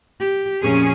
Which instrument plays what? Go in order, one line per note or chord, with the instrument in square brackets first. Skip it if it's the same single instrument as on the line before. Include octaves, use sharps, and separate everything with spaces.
[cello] G4
[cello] F2 [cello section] A#2 C#4 G#4